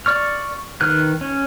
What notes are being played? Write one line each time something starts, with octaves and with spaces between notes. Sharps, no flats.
D5 C#6 F6
D#3 B4 F6 F#6
C#4